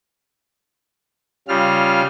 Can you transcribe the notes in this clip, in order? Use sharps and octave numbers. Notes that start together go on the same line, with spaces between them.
C#3 G3 F4 F6